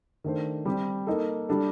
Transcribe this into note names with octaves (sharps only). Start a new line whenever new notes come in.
D#3 A3 D4 A4 C5
G3 C4 G4
A#3 D#4 A4
G3 D4 A4